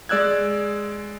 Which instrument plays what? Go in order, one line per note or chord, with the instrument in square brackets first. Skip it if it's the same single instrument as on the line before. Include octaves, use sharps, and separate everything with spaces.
[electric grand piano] G#3 D5 E6 F#6 G#6